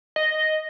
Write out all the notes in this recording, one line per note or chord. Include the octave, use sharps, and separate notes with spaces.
D#5